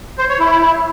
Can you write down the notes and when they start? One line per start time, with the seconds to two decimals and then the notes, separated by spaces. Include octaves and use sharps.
0.19 C5
0.29 C#5
0.39 E4